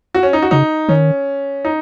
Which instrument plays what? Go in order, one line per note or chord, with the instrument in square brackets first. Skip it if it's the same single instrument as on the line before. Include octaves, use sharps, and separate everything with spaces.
[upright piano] F#4
C#4
D#4
F#4
[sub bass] C#3 [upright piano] D#4
[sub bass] D#3 [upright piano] C#4
[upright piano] D#4